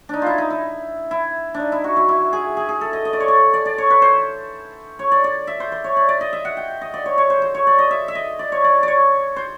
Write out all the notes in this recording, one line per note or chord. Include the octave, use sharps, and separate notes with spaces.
D4 D#4
E4 F4
D#4
E4
E4
D4
D#4
E4
F#4
E4
E4
G#4
G#4
G#4
A4
D#5
D#5
D5
C#5
D5
D5
D5
C#5
B4
C5
C#5
D5
D5
E5
C5
C5
C#5
D5
D5
D#5
E5
F#5
G5
D#5
D5
C#5
C#5
C5
C5
C#5
D5
D#5
E5
E5
D#5
D5
C#5
D5
C#5 D5
C5